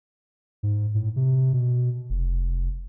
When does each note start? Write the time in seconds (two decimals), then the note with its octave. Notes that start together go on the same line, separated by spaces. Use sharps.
0.63 G#2
0.95 A2
1.16 C3
1.53 B2
2.10 F1